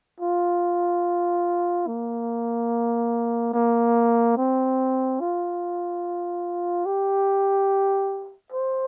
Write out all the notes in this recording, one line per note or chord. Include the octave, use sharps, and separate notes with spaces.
F4
A#3
A#3
C4
F4
G4
C5